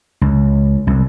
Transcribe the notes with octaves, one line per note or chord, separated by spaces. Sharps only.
C#2
C2